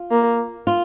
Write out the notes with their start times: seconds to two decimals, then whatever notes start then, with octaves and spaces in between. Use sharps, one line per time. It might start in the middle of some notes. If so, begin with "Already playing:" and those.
Already playing: F4
0.11 A#3
0.67 F4